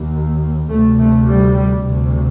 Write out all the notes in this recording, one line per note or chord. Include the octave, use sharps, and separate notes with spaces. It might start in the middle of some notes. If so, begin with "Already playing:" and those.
Already playing: D#2
D2 C3 A3
A3
G3
D2 C3